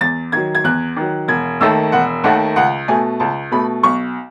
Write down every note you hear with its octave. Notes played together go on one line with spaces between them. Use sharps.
E2 A6
D#3 F#3 G#6
G#6
E2 F#6
D#3 F#3
E1 G#6
D#2 D#3 A3 E6
E1 F#5
D#2 D#3 A3 F#5
C#2 F#5
B2 A3 G#5
C#2 A5
B2 A3 B5
B1 C#6